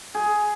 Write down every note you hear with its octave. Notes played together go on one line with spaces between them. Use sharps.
G#4